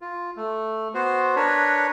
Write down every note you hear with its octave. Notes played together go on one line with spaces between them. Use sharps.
F4
A3
B3 F#4 C5
D4 A#4 B4 C#5